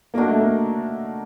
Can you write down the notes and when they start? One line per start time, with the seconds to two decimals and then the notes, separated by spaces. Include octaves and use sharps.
0.14 A#3 D4 F#4 A#4 D#5
0.28 A3
0.40 A#3